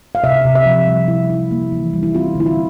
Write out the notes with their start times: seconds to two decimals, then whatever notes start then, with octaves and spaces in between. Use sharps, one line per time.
0.15 F5
0.24 C3 E5
0.45 C3
0.55 E5
0.66 F3
0.87 G3
1.08 E4
1.30 E4
1.51 A#3
1.72 E3
1.93 G3
2.03 E4
2.15 C4 F4
2.35 D3 E4
2.46 F4